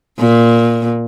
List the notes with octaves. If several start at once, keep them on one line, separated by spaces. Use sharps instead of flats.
A#2